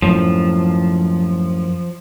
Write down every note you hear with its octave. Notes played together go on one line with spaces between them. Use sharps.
F#2 A2 F3